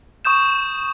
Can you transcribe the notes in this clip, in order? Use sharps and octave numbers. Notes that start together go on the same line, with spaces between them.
C#6 D#6 G6 E7